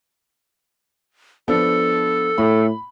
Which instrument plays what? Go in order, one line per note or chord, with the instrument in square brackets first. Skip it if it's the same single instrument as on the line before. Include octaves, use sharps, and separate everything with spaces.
[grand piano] F3 B3 D4 [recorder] A4
[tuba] A2 [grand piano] B5